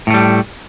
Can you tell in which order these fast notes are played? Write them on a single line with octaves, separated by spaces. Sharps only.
A2 A3 G3